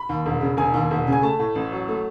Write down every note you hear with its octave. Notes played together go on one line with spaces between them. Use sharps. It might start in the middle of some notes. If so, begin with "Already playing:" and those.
Already playing: B5
D#2
E1
C#3
E1 G#5
D#2
E1
C#3
G#5
A3 A5
A2
A1
F#3
A3